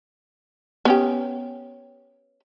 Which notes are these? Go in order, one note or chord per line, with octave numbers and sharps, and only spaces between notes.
B3 C#4 G4